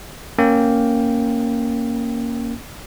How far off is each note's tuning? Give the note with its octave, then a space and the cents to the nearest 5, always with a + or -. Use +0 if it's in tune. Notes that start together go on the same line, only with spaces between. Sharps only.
A#3 +0 C#4 +0 G5 +0